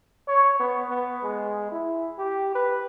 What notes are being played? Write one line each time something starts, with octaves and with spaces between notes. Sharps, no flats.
C#5
B3
B3
G#3
E4
G4
B4